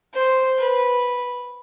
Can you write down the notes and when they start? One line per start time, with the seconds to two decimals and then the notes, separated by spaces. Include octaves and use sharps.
0.14 C5
0.58 B4